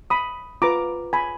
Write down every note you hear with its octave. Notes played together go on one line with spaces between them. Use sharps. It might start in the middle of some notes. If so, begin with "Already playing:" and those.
B5 D#6
F4 B4 A#5 D6
G#5 B5